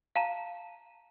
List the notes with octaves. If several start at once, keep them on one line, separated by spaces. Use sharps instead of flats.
F5 A5 A#5